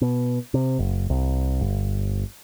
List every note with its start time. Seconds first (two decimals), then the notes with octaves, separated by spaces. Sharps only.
0.01 B2
0.54 C3
0.79 F#1
1.10 C2
1.61 G1